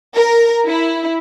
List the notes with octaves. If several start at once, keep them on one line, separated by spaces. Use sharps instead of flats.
A#4
E4